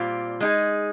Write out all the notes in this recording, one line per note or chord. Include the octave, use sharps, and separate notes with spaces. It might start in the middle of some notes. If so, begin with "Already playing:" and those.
Already playing: A#2 G3 C4 F4
G#3 D#4 G#4